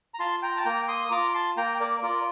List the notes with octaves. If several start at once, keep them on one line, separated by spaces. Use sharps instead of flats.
A#5
F4 A5 C6
G5 A#5
A5
A#3 G5 A#5
C6 D#6
D#6
F4 A#5 D6
A5 C6
A#3 G5 A#5
A#4 D5
F4 A#4 D5